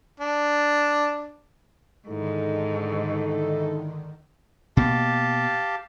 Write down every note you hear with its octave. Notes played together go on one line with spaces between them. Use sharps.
D4
G#2 D3 D#3 D#4 E4 A4
B2 A#3 G4 F5 A5